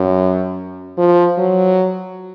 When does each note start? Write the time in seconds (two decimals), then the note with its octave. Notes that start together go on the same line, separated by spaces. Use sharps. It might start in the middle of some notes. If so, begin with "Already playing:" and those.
Already playing: F#2
0.97 F3
1.38 F#3